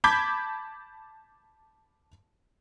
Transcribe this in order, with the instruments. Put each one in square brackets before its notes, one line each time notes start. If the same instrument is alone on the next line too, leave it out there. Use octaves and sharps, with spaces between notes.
[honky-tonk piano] A5 B5 D6 G6 G#6 B6